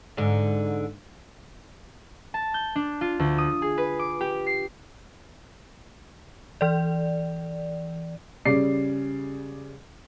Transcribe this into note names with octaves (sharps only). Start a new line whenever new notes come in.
G#2 D3
A5
G6
D4
F4
D2
D#6
G#4
B4
D6
G4
C7
E3 D5
C#3 G3 D5 C7